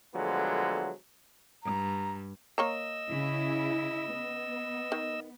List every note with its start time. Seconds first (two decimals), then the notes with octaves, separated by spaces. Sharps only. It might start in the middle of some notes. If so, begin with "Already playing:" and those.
0.14 D3 F3 F#3 G#3 A3 B3
1.64 G2 A#5
2.58 A#3 C#5 D#5 A#5 E6
3.09 C#3 E4
4.12 B3
4.92 D#3